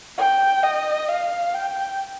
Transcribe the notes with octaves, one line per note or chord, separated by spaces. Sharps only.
G5
D#5
F5
G5